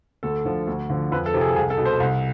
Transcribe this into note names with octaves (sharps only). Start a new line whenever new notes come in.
D2 A4
D3 F3
D2
D3 F3
F2 B4
A4
C3 F3
G#4
C2 G#4
A4
B2
C5
C2